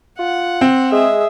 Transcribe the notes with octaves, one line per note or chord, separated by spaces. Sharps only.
F4 F#5
C4
G#3 G#4 E5